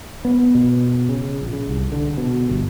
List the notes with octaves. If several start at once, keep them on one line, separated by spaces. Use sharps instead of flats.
B3
B2
C#3
A#1
C#3
C2
D3
B2
G1